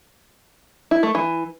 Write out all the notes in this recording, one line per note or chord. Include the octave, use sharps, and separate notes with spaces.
E4
A3
E3